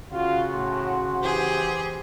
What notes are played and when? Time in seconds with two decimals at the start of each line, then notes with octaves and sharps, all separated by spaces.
0.12 C#3 F4 F#4
0.52 A2 C6
1.22 E3 G4 G#4 C5